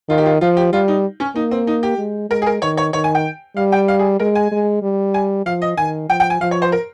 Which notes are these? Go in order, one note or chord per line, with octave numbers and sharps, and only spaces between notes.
D#3 F4
G4
F4
F3 F4
G4
G3 F4
D#4
C#4
A#3 D#4
C4
D#4
G4
G#3
G#3 A#4
G#4
A#4
D#3 C#5
C#5
D#3 C#5
G#5
G5
G3 F5
G5
F5
G#4
G#3 A#4
G#5
G#3
G3
G#5
F3 F5
D#5
D#3 G#5
F3 G5
G5
G#5
F3 F5
C#5
C5
A#4